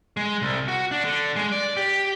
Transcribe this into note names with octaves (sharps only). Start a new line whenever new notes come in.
G#3
C2
F#4
D4
D3
G#3
D5
G4